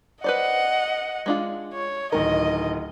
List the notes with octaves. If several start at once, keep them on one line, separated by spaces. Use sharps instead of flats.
B4 C5 D5 D#5 F#5
G#3 D4 F4
C#5
D1 D#3 A#4 D#5